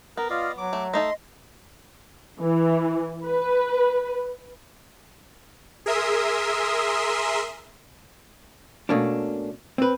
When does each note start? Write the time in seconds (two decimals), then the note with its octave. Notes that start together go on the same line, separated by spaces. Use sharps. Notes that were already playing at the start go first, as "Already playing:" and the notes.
0.17 B3 A#4
0.30 F4 D5 D#5 F5
0.58 F#3 D6
0.73 A3
0.94 A3 D#4 A4 D#5 C6 A#6
2.41 E3
3.26 B4
5.86 G#4 A#4 E5 C6 D#6
8.89 B2 A3 A#3 C#4 D4
9.78 C4 B4